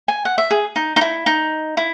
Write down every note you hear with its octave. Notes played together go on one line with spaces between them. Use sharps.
G#5
F#5
E5
G#4
D#4
D#4
E4
D#4
E4